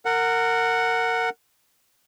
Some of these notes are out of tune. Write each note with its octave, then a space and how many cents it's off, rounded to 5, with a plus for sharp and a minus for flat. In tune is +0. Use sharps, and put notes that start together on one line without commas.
A#4 -25 F#5 +0